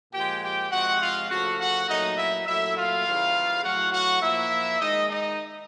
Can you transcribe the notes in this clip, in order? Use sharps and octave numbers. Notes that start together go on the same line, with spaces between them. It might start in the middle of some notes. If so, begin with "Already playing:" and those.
A#2 F3 G#3 G4 G5
G4 G5
C3 F3 G#3 F#4 F#5
F4 F5
C#3 F3 A3 F#4 F#5
F#4 F#5
A#2 F#3 A3 D#4 D#5
E4 E5
A#2 F#3 A3 E4 E5
F4 F5
C#3 E3 G3 A#3
A2 F#3 A3 F#4 F#5
F#4 F#5
A#2 F3 A#3 E4 E5
D#3 G#3 D#4 D#5
D#4 D#5